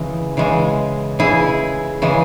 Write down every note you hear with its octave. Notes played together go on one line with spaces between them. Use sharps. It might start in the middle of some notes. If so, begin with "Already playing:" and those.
Already playing: C#3 E3 G#3
C#3 E3 G#3
C#3 E3 G#3 E4 G#4
C#3 E3 G#3